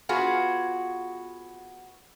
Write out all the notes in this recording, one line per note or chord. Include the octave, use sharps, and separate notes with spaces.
B3 F4 F#4 G#4